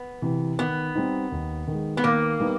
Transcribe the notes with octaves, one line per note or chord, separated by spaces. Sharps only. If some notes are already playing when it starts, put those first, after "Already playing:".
Already playing: B3
C3 E3
D#3 B3
G3 C4 D#4
D#2
D#3 G#3
B3
D#3 A#3
G3 B3 D#4